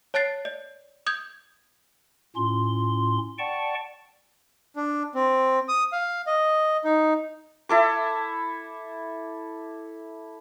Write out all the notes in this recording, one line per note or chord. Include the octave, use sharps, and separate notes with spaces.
C#5 A5 F#6 A6 C7
D5
D#6 G6 G#6
A2 C#4 F4 C6
D5 F#5 G5 A5 C#6
D4
C4
D#6
F5
D#5
D#4
E4 A4 D6